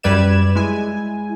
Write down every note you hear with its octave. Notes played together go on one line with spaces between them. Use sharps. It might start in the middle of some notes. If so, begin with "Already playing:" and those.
F#2 G3 B4 D5 G#6 E7
G#3 E4 G#5